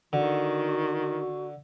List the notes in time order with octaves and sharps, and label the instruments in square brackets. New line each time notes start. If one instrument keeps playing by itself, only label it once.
[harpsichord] D3 [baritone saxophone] D#3 [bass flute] F#4